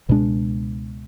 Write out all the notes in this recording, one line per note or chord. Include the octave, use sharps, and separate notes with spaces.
C#2 B2 G#3 D4